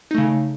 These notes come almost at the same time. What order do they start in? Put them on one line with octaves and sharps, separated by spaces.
D#4 A3 C#3